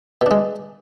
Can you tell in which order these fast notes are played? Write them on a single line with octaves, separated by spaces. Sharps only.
B2 D4 G#3